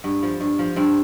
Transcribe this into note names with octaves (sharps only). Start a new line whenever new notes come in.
G2 B3
F3
G2
F3
G2 C4